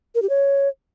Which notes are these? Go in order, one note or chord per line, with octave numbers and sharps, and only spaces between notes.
A#4
G4
C#5